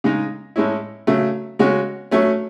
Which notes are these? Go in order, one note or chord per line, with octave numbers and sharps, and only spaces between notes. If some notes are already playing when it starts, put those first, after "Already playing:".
C#3 G#3 D#4
A2 G#3 C#4 E4
C#3 F#3 A3
C#3 G#3 C#4 F#4
F#3 A3 C#4